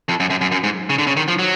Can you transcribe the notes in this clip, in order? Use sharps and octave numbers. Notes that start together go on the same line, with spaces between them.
F2
F#2
F#2
F#2
F#2
G#2
C#3
D3
C#3
D#3
F3
F#3